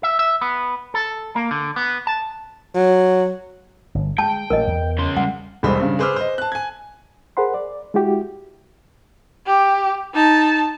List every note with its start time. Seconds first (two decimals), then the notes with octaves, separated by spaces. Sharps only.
0.03 E5
0.19 E5
0.41 B3
0.94 A4
1.36 A#3
1.51 D3
1.76 B3
2.07 A5
2.75 F#3
3.95 G1
4.18 G#3 G5 A5
4.50 A1 A#2 F#3 A#4 D#5
4.67 E2
4.98 C#3 C6
5.17 G3 G#3 F#5
5.63 E1 C2 G#3 C5 B5
5.80 G2 C#3
5.99 G#4 B4 C5 D6 E6 F6
6.16 C5 D#5
6.38 A5 F#6
6.52 G#5 G#6
7.37 G#4 A#4 C5 F#5 B5 C6
7.54 D5
7.94 G#3 E4 F#4 G4
9.46 G4
10.14 D#4 A5